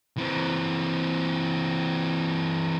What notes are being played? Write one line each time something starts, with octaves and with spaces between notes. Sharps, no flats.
E3 C4